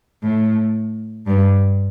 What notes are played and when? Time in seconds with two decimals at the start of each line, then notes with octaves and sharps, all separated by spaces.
0.23 A2
1.27 G2